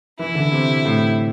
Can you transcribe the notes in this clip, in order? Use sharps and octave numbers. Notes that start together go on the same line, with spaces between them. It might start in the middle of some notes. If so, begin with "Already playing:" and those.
E3 E4
D3
C3
A2